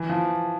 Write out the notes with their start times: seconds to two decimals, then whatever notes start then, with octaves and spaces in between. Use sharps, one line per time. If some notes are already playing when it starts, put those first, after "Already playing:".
Already playing: E3
0.10 F3